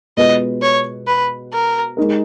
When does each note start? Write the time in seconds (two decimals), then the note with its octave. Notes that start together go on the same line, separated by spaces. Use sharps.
0.17 B2 G#3 B3 F4 B4 D#5
0.62 C#5
1.07 B4
1.53 A#4
1.97 G#3 D#4 A#4